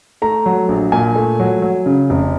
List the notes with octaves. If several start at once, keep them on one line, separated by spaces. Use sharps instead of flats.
A3 A#5
F#3
A#1
A#2 G#5
A3
F#3
F#3
C#3
F1